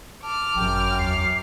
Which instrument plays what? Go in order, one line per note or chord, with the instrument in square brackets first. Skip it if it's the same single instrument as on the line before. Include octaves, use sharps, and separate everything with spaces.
[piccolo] A5 [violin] D6 F6
[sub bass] G#1 [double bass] F#2 [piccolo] G5
[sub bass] E2 [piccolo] C7